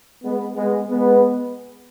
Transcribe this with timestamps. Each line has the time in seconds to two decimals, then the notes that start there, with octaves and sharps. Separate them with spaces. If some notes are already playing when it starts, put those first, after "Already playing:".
0.22 G#3 B3
0.55 G#3 B3
0.87 G#3 B3